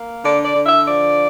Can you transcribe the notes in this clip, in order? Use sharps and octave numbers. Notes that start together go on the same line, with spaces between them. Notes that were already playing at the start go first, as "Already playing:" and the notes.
Already playing: A#3
D3 D5
D5
D3
E5
F3 D5